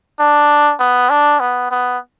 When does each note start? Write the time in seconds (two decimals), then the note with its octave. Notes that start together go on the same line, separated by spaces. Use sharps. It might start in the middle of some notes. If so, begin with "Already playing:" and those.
0.19 D4
0.79 B3
1.10 D4
1.40 B3
1.71 B3